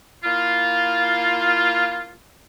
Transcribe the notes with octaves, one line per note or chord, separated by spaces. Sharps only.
A#3 E4 F4